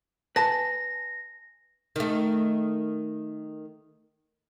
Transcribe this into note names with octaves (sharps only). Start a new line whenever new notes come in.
B4 G#5 A5 A#6
D#3 A3